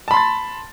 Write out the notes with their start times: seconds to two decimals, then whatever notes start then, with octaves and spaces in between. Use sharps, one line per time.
0.08 A5
0.11 B5
0.14 C6
0.17 A6